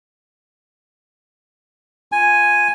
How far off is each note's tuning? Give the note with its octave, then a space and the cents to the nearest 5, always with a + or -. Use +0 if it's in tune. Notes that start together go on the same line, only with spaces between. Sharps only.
F4 +0 G#5 +0